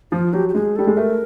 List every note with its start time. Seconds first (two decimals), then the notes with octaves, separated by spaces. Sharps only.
0.12 F3 F4
0.33 F#3 G4
0.49 G4
0.54 G#3 G#4
0.76 G3 A4
0.87 G#3
0.97 A3 A#4